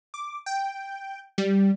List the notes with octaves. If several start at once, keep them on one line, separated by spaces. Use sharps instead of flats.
D6
G5
G3